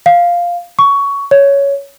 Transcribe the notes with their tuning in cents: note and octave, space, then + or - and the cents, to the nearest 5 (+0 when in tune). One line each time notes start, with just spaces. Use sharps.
F5 +0
C#6 +15
C#5 +10